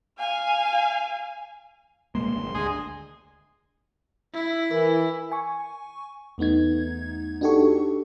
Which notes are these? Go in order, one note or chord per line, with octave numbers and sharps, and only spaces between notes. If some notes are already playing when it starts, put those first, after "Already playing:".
F5 G#5
B2 G#3 A#3 C6
G#1
D2 G#3 G#4
E4
E3 A#4
G#5 C#6
E2 A3 B3 D#4 G#6
D4 D#4 F#4 G4 A4 C#6